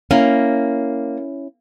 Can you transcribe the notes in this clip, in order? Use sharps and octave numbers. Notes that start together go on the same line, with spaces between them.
A#3 C#4 E4